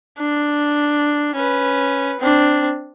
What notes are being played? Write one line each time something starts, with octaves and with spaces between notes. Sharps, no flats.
D4
C#4 B4
C4 D4